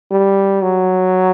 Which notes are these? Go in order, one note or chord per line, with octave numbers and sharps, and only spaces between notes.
G3
F#3